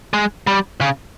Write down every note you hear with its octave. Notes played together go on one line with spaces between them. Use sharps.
G#3
G3
C#3